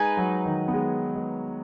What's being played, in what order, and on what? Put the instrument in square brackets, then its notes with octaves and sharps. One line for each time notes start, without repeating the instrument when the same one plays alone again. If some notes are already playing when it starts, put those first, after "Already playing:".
Already playing: [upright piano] G#3 [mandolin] D#4 B4 G#5
[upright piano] F#3
D#3
B3
G#3
G#3